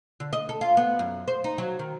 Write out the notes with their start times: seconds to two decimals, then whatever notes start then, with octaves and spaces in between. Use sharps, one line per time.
0.20 D3
0.33 D#5
0.49 A4
0.61 F4
0.77 B3
0.99 F#2
1.28 C5
1.44 D#4
1.58 F#3
1.79 D#3